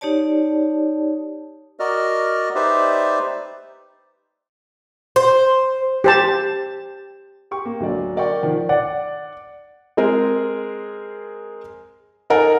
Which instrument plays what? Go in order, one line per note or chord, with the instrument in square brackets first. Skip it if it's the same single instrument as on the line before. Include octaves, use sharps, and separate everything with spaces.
[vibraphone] D#4 G4 C#5 D5 A5
[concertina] F#4 A#4 D5 D#5 F6
D#4 G4 B4 C5 D5 E5
[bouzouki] C5
[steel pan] G4 C5 A5
[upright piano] G4 G5 C#6
A#3
D2 F#3 D5
A#4 D5 F#5 G5 C#6
D#3 F3
[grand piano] D5 F#5
[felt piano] G#3 C4 G#4 A#4
D#4 A4 A#4 F#5 G#5